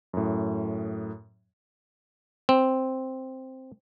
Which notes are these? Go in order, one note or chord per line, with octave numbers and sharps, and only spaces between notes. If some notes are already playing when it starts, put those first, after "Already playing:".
F#2 A2
C4